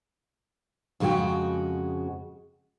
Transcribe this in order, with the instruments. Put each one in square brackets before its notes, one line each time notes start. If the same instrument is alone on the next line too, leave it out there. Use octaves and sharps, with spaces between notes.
[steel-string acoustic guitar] F2 C#3 G#3 F#4 G5